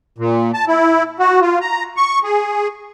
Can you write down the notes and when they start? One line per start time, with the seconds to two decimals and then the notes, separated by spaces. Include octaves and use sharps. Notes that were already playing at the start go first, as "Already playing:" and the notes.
0.18 A#2
0.54 A5
0.68 E4
1.19 F#4
1.41 F4
1.61 A#5
1.97 C#6
2.24 G#4